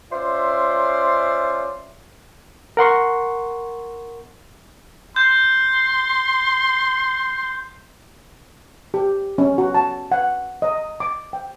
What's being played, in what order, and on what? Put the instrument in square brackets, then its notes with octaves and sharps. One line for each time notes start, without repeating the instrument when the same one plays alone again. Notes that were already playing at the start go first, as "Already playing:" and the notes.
[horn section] C#4 F4 C5 D5 E5
[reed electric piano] A#4 F#5 C6 C#6
[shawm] C6 [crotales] G6
[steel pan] G4
C#4
F#4
A5
F#5
D#5
D6
G5